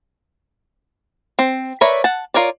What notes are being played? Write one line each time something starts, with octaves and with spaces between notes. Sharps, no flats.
C4
A#4 B4 C#5 D5 E5
F#5 A5
F4 A#4 C#5 D5